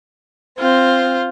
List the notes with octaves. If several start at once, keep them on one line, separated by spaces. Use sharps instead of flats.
C4 F4 C5